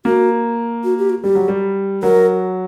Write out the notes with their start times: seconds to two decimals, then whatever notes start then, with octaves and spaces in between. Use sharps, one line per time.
0.05 A#3 F#4
0.84 F#4
0.98 G4
1.10 F#4
1.23 G3 G4
1.35 F#3
1.48 G3
2.03 F#3 A#4